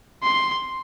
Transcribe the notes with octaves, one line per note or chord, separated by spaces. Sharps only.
C6